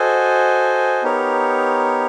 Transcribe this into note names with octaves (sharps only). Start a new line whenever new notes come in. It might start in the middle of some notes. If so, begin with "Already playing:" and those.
Already playing: F#4 A4 C5 D#5 G#5
B3 D#4 G4 A#4 C#5